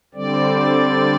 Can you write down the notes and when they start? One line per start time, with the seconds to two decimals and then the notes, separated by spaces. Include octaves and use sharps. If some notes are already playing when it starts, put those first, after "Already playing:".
0.14 D3 G3 C4 D5